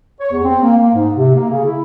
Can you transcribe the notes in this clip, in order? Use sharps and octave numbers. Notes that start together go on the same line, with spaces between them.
C#5
E2
C4
A#3
A#3
G#2
C3
A#3
C#3
E4